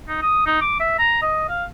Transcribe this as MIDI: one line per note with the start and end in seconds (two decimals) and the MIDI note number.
0.08 0.19 63
0.22 0.41 87
0.46 0.60 63
0.61 0.80 86
0.80 0.95 76
0.99 1.21 82
1.22 1.47 75
1.49 1.64 77